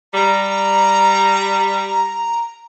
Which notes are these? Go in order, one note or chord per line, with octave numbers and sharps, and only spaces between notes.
G3 A#5